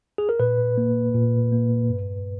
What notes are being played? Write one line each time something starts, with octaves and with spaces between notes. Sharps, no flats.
G#4
A#4
A#2 B4
A#3
A#2
A#3
G2